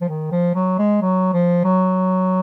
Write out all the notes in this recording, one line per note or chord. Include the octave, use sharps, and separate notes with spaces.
F3
D#3
F3
F#3
G#3
F#3
F3
F#3